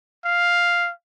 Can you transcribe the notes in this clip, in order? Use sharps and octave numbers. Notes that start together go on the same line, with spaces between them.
F5